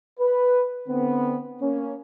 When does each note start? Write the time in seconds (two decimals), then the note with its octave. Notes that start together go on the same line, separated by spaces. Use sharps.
0.19 B4
0.88 D3 B3 C4
1.61 A#3 C#4